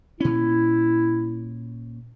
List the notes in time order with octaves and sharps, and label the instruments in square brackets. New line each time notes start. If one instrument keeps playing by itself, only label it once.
[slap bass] A#2 C#4 [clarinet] E4